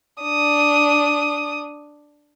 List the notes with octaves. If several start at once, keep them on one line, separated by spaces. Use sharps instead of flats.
D4 D#6